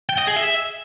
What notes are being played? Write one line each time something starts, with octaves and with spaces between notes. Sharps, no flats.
G5
D#5
G#4
E5